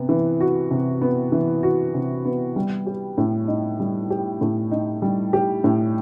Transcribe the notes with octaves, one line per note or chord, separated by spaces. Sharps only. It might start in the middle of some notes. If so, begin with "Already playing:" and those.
Already playing: C3 B3
E3
F#4
C3
B3
E3
F#4
C3
B3
G3
G4
A2
D#4
G3
G4
A2
D#4
G3
G4
A2